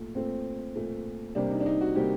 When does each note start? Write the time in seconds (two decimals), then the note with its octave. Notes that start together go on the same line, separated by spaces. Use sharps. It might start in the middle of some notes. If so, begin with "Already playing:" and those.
Already playing: A#2 A3
0.15 A#2 A3 C4
0.76 A#2 A3
1.35 C3 G3 A#3 D4
1.51 D#4
1.60 D4
1.66 D#4
1.81 F#4
1.95 C3 G3 A#3 G4